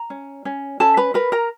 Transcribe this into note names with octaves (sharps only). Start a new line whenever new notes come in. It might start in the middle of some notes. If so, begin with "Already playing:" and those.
Already playing: A#5
C#4
C#4
C#4 A4 A5
B4 B5
A#4 B4 B5
A#4 A#5